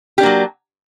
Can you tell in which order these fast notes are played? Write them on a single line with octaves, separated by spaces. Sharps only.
G4 D4 A#3 F#3